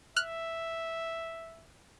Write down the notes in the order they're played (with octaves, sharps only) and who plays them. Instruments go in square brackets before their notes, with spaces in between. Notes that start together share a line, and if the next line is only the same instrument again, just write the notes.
[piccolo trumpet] E5 [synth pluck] F6 F#6